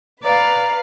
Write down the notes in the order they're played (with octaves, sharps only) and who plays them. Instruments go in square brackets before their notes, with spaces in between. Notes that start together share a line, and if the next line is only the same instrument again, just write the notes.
[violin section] B4 F5 [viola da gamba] D5 [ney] A#5